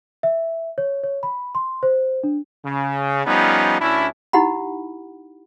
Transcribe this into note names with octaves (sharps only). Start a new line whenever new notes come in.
E5
C#5
C#5
B5
C6
C5
D4
C#3
F3 G3 B3 C#4 D#4
D2 C#4 D4 E4
D#4 E4 G4 F#5 B5